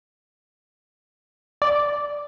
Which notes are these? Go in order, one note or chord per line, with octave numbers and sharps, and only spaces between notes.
D5